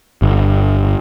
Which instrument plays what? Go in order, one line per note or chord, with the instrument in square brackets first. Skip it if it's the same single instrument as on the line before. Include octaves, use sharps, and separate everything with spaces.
[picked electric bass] G1